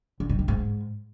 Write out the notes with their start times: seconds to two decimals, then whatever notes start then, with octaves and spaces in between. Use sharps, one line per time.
0.20 D3
0.29 G2
0.39 D#3
0.48 G#2